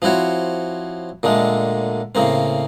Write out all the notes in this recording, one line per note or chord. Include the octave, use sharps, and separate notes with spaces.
F3 C4 E4 F#4 C#5
A#2 D3 G#3 A3
A2 C#3 A#3 C4